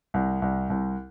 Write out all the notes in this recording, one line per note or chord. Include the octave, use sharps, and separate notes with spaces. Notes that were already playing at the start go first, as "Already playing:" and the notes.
C2
C2
C2